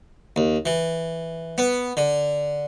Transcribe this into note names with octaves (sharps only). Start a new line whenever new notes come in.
D#2
E3
B3
D3